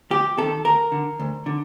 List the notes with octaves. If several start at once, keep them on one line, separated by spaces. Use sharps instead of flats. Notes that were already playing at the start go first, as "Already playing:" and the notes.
D2 G4
C3 D#3 A4
D2 A#4
D3
D2
D3